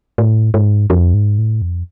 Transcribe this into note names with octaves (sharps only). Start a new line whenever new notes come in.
A2
G#2
F2
G#2
A2
F2